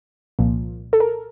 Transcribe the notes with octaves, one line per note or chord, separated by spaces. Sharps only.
C2 A#2 F3
A4
A#4